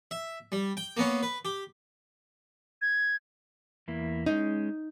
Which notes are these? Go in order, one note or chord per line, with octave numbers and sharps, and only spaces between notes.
E5
G3
G5
A#3 B3 C#4
B4
G4
G#6
E2 A#3 E4
G#3 C#4 D#4